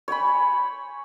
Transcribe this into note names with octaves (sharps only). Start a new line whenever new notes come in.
C#5 G5 G#5 B5